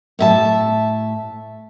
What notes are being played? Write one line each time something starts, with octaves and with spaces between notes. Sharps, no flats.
A2 E5 A5